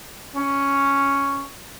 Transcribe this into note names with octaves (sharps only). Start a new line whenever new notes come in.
C#4